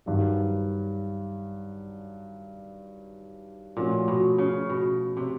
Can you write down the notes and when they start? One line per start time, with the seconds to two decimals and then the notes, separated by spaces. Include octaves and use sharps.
0.06 G2 D#3 F#3
3.77 A#2 F3 A3 C#4 F#4
4.08 B2
4.38 C#3
4.69 B2
5.17 C3